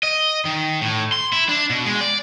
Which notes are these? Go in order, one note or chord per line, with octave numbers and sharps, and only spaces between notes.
D#5
D#3
A2
C6
E4
D4
B2
G#3
D5